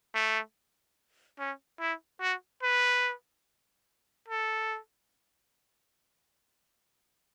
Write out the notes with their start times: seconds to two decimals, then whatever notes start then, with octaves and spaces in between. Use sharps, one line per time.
0.15 A3
1.39 C#4
1.80 E4
2.21 F#4
2.63 B4
4.28 A4